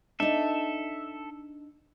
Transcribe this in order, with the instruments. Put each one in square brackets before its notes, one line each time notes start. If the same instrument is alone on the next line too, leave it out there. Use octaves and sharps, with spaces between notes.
[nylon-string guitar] D4 D#4 [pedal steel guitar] A4 E5